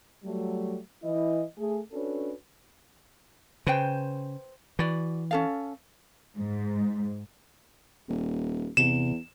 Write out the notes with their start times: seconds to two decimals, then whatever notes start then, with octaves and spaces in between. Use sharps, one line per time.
0.23 F#3 G3 A3
1.03 E3 E4 D#5
1.57 A3 G#4
1.92 C#4 D4 F#4 A4 B4 C#5
3.67 C#3 B4 C5 G5
4.79 E3 F#4 D5
5.31 C#4 A4 F5
6.37 G#2
8.09 D#1
8.77 E2 C3 E7